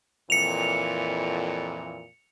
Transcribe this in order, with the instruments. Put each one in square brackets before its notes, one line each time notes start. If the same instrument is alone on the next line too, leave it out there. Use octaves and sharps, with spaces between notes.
[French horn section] F2 A#2 E3 [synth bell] C#7 F7